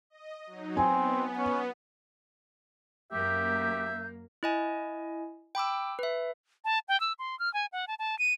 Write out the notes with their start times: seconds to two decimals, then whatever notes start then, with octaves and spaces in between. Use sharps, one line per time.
0.10 D#5
0.47 F#3 D#4
0.77 B3 C4 G#5
1.39 C#4
3.12 F#2 A#3 G4 E5 G6
4.43 E4 D#5 G#5
5.55 G5 B5 D6 E6
5.99 B4 E5
6.65 A5
6.88 G5
7.00 E6
7.19 C6
7.39 F6
7.54 G#5
7.72 F#5
7.88 A5
7.99 A5
8.19 D#7